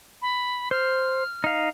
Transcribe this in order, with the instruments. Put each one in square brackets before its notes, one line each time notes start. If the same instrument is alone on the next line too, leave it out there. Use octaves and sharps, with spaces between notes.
[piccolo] B5
[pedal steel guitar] C5 [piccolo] F6
[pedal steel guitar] D#4 F5